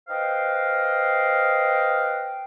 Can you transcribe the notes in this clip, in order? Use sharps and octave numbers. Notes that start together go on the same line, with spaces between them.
B4 C5 D#5 F5 G5